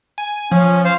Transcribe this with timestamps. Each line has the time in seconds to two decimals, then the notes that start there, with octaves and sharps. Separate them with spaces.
0.18 G#5
0.51 F3 C#4
0.85 C5 F5